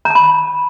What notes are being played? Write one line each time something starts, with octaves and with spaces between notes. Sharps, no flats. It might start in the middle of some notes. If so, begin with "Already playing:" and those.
A#5
A5
B5